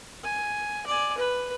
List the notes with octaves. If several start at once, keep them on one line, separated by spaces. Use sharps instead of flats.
G#5
D5 G#5
B4